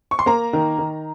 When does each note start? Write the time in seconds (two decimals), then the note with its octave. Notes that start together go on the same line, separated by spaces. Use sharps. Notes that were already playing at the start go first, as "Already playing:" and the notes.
0.11 C#6
0.19 C6
0.26 A#3 A#5
0.53 D#3
0.78 D#3